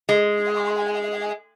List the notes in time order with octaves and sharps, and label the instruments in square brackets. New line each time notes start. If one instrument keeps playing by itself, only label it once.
[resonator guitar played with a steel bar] G#3